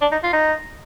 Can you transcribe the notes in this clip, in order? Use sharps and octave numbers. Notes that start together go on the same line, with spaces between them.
D4
D#4
F4
D#4